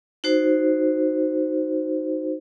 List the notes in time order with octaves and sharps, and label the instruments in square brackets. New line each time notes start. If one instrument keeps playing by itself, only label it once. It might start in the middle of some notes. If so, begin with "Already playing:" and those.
[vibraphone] D#4 F#4 C5